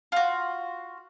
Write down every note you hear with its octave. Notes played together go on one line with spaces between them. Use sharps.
F4 F#4